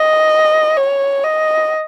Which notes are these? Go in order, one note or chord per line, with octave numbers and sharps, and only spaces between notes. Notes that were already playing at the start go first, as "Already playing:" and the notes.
Already playing: D#5
C#5
D#5